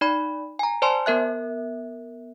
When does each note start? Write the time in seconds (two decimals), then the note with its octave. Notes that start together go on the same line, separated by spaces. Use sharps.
0.01 D#4 D5 B5
0.59 G#5 A#5
0.82 C5 D5 G#5 A5 C6
1.06 B3 A#4 E5 F#6